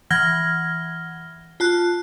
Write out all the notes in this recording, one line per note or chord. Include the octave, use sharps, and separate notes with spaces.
E3 F#5 F6 G#6 A#6 G7
F4 A5 F#6